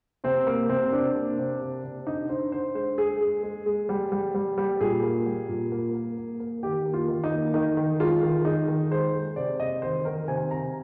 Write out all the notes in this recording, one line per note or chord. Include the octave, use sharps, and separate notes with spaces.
C3 C4
A#3
C3 C4
C3 D4
A#3
C3
C3
C3
D3 D#4
D3 C5
D3 C5
G#3 C5
G#3 G#4
G#3
G#3
G#3
G3
G3
G3
G3
A#2 G#4
A#3
G3
A#2
A#3
A#3
A#3
A#3
D#3 G4
A#3
F4
D#3
D#4
A#3
D#3 D#4
D#3
G#3 F4
D#3
G#3 D#4
D#3
G#3 C5
G#3
C3 D5
C3 D#5
D#3 C5
D#3 A#4
C3 G#5
C3 A#5